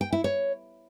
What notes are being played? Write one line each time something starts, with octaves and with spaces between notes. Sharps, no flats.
G5
E4
C#5